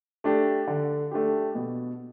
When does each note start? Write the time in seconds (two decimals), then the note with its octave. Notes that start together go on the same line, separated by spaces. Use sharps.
0.24 A3 D4 G4
0.67 D3
1.11 A3 D4 G4
1.55 B2